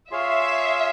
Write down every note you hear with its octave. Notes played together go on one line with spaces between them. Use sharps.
F4 G#4 C#5 E5 F5